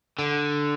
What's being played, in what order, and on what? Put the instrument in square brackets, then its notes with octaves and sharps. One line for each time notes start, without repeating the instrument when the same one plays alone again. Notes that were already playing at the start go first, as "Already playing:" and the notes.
[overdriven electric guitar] D3